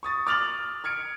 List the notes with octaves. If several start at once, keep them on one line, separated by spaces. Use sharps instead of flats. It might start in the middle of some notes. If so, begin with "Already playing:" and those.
C#6 D#6 A6
D6 F6 A6 F7 F#7
F6 G#6 C#7 D7